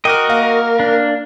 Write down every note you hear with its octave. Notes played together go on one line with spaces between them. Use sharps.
F#4 A#4 D#5 G5 D6 F6
A#3 F5
D4